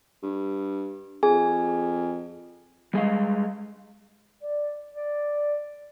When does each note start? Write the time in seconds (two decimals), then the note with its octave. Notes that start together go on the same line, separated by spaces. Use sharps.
0.23 G2
1.23 F2 G#4 G#5
2.94 G3 G#3 D#5 F5
4.42 D5
4.94 D5